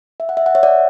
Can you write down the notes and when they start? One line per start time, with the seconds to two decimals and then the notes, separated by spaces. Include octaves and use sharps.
0.20 E5
0.29 F#5
0.37 E5
0.46 F#5
0.55 C#5 E5
0.63 D5 F#5